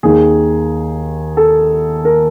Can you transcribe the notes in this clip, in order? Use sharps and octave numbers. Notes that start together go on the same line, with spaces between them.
D#2 D#3 G#4
A4
A#4